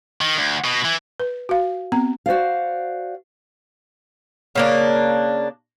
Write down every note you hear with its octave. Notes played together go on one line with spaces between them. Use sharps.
D#3
D2
B2
E3
B4
F#4 F5
B3 C4 A#5
F#4 C5 D5 F5
C#3 A#3 D4